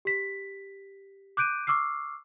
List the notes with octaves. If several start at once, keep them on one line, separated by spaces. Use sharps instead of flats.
G4 B6
D6 F#6 G6 D7 D#7
C#6 D6 E6 F6 C7